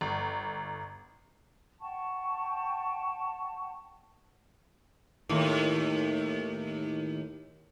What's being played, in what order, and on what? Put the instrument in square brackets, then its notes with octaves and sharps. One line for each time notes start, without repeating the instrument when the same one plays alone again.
[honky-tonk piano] G1
[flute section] F#5 G5 A5 C#6
[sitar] D#2 A2